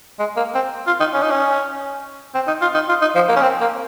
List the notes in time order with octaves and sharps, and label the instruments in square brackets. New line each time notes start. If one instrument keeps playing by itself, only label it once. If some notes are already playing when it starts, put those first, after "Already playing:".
[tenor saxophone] G#3
A#3
C4
F4
D#4
C#4
D#4
C#4
C4
D#4
F4
D#4
F4
D#4
F3
A#3
C#4
C4
A#3